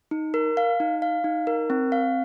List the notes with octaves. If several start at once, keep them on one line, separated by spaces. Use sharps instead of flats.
D#4
A#4
F5
D#4
F5
D#4
A#4
C4
F5